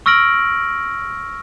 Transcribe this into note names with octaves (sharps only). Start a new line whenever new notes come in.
C#6 E6 F6 A#6 D7 F#7